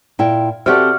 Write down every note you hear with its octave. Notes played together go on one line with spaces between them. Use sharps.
A#2 E4 G5
C3 C4 F#4 G4 A4 D5 F6